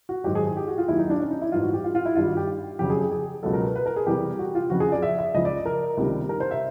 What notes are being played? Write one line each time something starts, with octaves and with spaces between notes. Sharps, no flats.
F#4
G#2 D#3 F#3 G4
G#4
G#4
G4
F#4
F4
D#2 D#3 F#3 E4
D#4
D4
C#4
D#4
E4
G#2 E3 G3 F4
F#4
G4
F4
F4
E4
G2 D#3 G3 F4
F#4
G4
F2 C#3 F#3 G4
G#4
G#4
G#4
C#2 B2 F#3 A4
A#4
B4
B4
A#4
G#4
E2 C3 E3 G3 G4
F#4
F4
F2 C#3 F3 F#4
G#4
D5
E5
E5
C#2 C#3 F3 D#5
D5
A#4
C#2 C3 D#3 G3
A#4
C5
E5